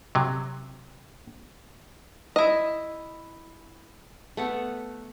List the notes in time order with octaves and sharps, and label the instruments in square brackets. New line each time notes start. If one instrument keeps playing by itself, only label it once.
[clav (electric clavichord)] C3 F#3
[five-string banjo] E4 D#5
[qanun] A3 B3 F#5